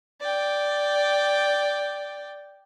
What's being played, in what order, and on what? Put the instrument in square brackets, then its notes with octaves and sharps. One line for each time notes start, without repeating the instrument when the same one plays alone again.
[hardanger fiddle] D5 G5